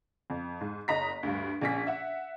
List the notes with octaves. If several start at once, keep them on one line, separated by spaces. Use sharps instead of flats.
F2
G#2
F#1 D#5 A#5 B6
D2 G2
A#1 C#4 B6
E5 F#5